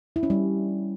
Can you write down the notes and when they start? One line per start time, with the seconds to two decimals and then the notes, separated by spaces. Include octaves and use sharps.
0.16 E4
0.23 C#4
0.30 G3